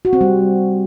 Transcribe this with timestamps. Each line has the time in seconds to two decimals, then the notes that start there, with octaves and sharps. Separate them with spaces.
0.05 F#4
0.13 C4
0.21 G3